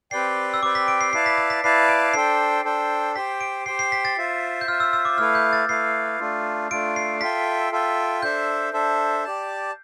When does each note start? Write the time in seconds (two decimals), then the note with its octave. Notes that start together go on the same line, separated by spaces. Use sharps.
0.11 C4 G4 B4 D5 G5 C7
0.54 E6
0.62 C4 G4 B4 D5 G5 D6
0.75 B6
0.88 D7
1.01 C7
1.13 E4 B4 D5 F5 A5 C7
1.26 B6
1.38 A6
1.50 B6
1.63 E4 B4 D5 F5 A5 C7
1.89 D7
2.14 D4 A4 C5 G5 C7
2.64 D4 A4 C5 G5
3.15 G4 C5 G5 B6
3.41 D7
3.66 G4 C5 G5 C7
3.79 C7
3.92 B6
4.05 A6
4.18 F4 C5 E5
4.61 G6
4.67 F4 C5 E5 F6
4.80 E6
4.93 E6
5.05 D6
5.18 A3 E4 B4 F5 F6
5.35 G6
5.53 A6
5.69 A3 E4 B4 F5 C7
6.20 A3 D4 F4
6.70 A3 D4 F4 D7
6.96 C7
7.21 F4 A4 E5 G5 B6
7.72 F4 A4 E5 G5
8.22 D4 A4 C5 E5 G6
8.73 D4 A4 C5 E5
9.24 G4 D5 A5